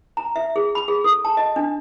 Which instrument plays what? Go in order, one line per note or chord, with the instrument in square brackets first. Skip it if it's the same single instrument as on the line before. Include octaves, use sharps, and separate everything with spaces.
[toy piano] A#5
E5
G#4
B5
G#4
A4
A5
D#5
D4